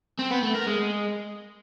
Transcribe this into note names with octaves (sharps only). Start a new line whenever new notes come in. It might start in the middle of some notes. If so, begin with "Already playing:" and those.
C4
B3
A3
A#4
G#3